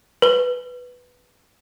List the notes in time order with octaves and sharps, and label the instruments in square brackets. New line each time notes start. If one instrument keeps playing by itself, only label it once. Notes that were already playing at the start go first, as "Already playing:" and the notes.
[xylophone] B4 G7